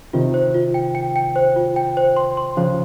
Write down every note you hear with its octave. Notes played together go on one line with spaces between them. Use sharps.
C3 D#3 F4
C5
F4
G5
G5
G5
C5
F4
G5
C5
C6
C6
C#3 F3 C5